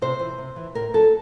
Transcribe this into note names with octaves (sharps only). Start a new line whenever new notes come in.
C3 C5
E3
C3
E3
A2 A#4
F#3 A4